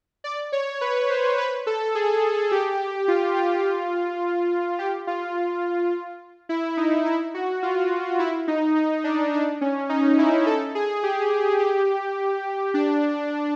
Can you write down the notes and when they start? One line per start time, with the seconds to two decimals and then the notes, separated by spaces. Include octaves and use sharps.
0.24 D5
0.52 C#5
0.81 B4
1.09 C5
1.38 B4
1.67 A4
1.95 G#4
2.51 G4
3.08 F4
3.37 F4
4.79 G4
5.07 F4
6.49 E4
6.77 D#4
7.06 E4
7.34 F#4
7.63 F4
8.19 E4
8.48 D#4
8.76 D#4
9.04 D4
9.33 D4
9.61 C#4
9.89 D#4
10.18 E4
10.46 A4
10.75 G#4
11.03 G4
11.60 G4
12.74 D4